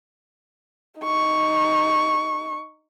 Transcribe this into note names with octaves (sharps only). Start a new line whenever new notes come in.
D#4 C#6